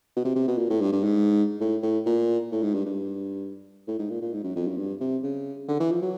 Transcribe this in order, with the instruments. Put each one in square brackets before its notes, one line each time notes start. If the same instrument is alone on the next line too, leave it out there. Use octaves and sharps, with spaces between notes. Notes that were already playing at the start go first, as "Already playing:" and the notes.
[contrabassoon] B2
C3
C3
B2
A#2
A2
G2
G2
G#2
A2
A2
A#2
A2
G#2
G2
G2
A2
G#2
A#2
A#2
G#2
F#2
F2
F#2
G2
C3
C#3
D3
E3
F3
F#3